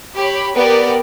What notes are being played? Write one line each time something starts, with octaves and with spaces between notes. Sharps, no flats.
G4 C#5 B5
B3 G4 A#4 D5 G5